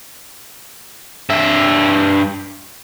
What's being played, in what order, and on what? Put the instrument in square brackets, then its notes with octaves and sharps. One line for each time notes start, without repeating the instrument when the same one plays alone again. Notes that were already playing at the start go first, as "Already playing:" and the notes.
[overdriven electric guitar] G2 E5